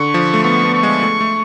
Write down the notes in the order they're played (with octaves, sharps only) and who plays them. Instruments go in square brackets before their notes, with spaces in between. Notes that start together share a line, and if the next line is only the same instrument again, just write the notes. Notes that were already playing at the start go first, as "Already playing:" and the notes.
Already playing: [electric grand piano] D3 [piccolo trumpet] C#6
[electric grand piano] F3
A3
[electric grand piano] B3 [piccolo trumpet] C#6
[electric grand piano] B3
[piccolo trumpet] C#6
[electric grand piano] G#3
A3
A3